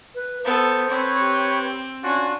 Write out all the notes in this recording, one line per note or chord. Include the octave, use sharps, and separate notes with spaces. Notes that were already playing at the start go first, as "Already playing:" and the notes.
B4
B3 A4 C5
C4 B4 C#5
G4
C#4 D4 F4 F#4